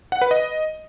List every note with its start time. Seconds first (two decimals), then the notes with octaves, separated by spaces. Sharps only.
0.12 F#5
0.22 B4
0.31 D#5